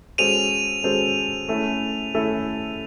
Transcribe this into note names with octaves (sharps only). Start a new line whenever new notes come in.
G#3 C#4 F#4 A4 C5 D#7 F7
G#3 C#4 F#4 A4 C5
A3 C#4 E4 A4
A3 C#4 E4 A4